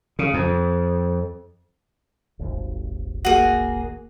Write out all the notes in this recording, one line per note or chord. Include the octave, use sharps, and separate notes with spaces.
C#3
F2
D#1 G#1
A#3 F#4 G#4 D#5